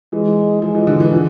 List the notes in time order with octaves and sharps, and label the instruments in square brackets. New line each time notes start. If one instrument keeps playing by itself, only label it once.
[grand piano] E3 [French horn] G#3
[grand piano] F3 [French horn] G#3
[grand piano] E3
D3
E3
D3